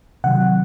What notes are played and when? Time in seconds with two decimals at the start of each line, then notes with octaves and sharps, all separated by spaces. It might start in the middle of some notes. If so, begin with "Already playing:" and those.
0.24 C3 D#3 F#3 F#5